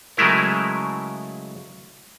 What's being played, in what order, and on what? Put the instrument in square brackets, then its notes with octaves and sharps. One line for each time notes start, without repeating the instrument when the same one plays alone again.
[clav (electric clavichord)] C#3 F#3 G#3 A3 E4 A#4